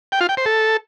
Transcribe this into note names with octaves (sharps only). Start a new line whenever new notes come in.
G5
F4
G5
C5
A4